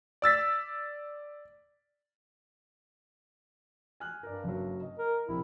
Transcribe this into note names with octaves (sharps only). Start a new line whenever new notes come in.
D5 E6 A6 B6
G#5 F6 F#6
G2 A#4 D5
F#1 F#3
D#5
A#4
A#1 C3 E4